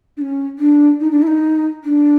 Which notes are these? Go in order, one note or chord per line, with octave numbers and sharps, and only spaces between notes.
D4
C#4
D4
D#4
D4
E4
D#4
D4